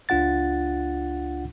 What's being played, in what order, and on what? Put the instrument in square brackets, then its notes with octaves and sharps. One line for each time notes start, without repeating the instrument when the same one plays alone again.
[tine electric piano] C#2 D4 F4 F#5 A6